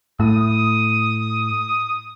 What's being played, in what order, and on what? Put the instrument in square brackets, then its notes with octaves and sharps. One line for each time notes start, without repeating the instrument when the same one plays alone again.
[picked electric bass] A2 [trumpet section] D#6